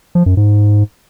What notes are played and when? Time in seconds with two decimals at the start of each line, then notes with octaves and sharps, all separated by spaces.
0.15 F3
0.26 F#2
0.37 G#2